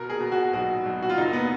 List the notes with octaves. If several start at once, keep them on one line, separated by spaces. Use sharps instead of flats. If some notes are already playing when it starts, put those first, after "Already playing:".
Already playing: B2 A#4
G#4
B2
F#4
B1 F#4
B1
F#4
F4
F#1 D#4
B3